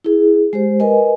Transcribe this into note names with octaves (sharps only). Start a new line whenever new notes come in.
E4 G#4
G#3 G4 C5
A#4 B4 D#5 G#5